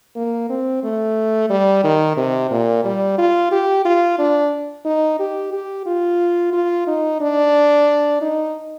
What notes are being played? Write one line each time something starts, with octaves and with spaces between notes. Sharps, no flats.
A#3
C4
A3
G3
D#3
C3
A#2
G3
F4
G4
F4
D4
D#4
G4
G4
F4
F4
D#4
D4
D#4